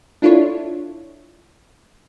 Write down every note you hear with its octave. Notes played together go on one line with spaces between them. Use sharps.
D4 E4 F4 A4 C#5